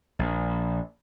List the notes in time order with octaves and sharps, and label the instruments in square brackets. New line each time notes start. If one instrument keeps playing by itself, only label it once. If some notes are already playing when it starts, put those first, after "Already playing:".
[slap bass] A#1